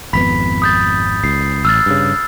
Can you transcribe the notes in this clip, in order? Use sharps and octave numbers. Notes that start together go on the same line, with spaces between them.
G#1 F2 B3 B5 B6
D#6 G6 A6
C#2 C7
A1 E6 F6 A6
G2 C#3